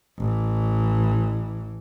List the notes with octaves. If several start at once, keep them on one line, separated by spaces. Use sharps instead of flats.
A1 E3